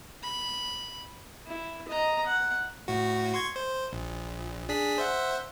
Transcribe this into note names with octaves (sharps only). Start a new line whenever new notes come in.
B5
E4
D#5 A#5
F#5
A2 F#4
C6 C#6 G#6
C5
A#1
D4 G#4 B6
C5 E5 F#5